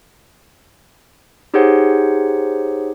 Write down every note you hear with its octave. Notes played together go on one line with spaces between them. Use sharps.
D#4 G4 G#4 C5 C#5 F#5